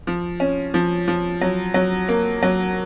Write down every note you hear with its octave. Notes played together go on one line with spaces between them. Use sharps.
F3
C#4
F3
F3
F#3
F#3
A#3
F#3